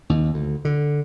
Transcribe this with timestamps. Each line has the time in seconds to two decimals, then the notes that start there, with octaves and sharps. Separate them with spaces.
0.09 D#2
0.34 D2
0.65 D3